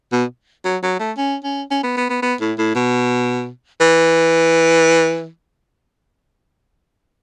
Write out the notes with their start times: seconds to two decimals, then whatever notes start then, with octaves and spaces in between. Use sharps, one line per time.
0.12 B2
0.65 F#3
0.83 F#3
0.99 A3
1.17 C#4
1.44 C#4
1.71 C#4
1.83 B3
1.97 B3
2.10 B3
2.22 B3
2.41 A2
2.58 A2
2.75 B2
3.80 E3